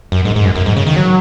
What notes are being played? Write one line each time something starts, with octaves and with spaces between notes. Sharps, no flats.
F#2
G#2
G#2
F#2
F#2
G#2
C#3
D#3
F#3